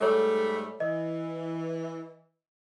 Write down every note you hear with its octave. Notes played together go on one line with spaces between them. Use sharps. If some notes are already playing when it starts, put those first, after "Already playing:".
G#2 G3 A3 A4 C#5
E3 D#5